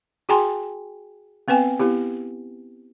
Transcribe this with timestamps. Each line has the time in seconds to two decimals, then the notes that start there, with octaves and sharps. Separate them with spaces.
0.29 F#4 G#4 G5 G#5 A#5 C6
1.48 B3 C4 B4 G5 G#5
1.79 B3 E4 G4